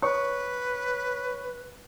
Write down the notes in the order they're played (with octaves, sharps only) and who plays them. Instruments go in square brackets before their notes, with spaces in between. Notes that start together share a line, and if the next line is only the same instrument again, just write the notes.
[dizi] B4 [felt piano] C#5 C#6